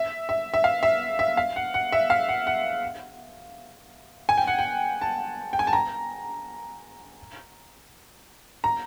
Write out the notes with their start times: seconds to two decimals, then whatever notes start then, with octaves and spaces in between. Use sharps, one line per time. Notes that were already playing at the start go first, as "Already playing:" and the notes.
Already playing: E5
0.29 E5
0.54 E5
0.64 F5
0.83 E5
1.19 E5
1.37 F5
1.56 F#5
1.74 F#5
1.92 E5
2.10 F5
2.29 F#5
2.47 F#5
4.29 G#5
4.37 G5
4.47 F#5
4.59 G5
5.01 A5
5.53 G5
5.59 G#5
5.67 A5
5.73 A#5
8.64 A#5